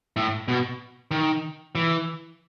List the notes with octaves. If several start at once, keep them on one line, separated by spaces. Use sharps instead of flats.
A2
B2
D#3
E3